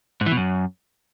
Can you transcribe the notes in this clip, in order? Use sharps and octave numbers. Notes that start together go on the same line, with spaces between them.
G#2
E3
B2
F#2